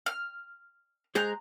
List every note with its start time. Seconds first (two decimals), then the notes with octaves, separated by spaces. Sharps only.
0.06 F6
1.15 G#3 G#4 C5 A#5 F#6 G6